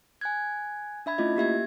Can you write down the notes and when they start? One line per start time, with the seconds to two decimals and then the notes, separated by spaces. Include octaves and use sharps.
0.21 G#5 F#6 G#6
1.06 D4 E5 B5 G#6
1.18 A3 C#4 E4 F4 D#5
1.37 A#3 G4 E5 G#6